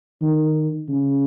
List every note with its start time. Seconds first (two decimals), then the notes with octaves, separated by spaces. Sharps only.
0.22 D#3
0.89 C#3